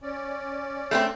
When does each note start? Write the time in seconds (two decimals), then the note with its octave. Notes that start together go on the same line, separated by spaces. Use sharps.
0.03 C#4 D5
0.91 A3 B3 C4